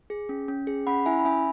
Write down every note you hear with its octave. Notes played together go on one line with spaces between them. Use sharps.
G#4
C#4
C#4
G#4
C#4 F#5 B5
E4 E5 G#5
B5
C#4 E5 G#5